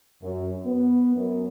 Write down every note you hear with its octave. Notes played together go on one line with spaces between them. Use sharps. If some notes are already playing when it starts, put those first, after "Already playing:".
F#2
B3
F#2